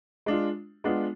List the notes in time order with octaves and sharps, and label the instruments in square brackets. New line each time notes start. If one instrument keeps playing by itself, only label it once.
[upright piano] G#3 D4 F4
G#3 B3 D4 F4